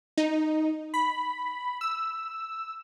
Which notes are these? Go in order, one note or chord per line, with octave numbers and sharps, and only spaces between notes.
D#4
B5
E6